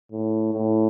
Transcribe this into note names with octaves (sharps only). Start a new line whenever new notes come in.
A2
A2